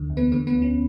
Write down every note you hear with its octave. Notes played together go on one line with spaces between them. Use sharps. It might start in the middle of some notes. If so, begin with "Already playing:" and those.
Already playing: D2 D3
E2
B3 B4
D3 B3 B4
B3 B4
D2
C#4